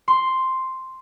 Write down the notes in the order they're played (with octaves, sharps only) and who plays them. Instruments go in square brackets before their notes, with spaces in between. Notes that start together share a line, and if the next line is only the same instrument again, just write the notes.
[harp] C6